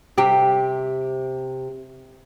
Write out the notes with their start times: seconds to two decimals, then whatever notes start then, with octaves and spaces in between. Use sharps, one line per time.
0.18 C3 G4